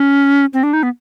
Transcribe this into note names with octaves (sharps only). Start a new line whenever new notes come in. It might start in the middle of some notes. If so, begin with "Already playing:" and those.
Already playing: C#4
C4
D4
D#4
B3